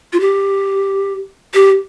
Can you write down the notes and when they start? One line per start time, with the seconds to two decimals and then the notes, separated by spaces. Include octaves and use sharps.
0.13 F4
0.20 G4
1.54 G4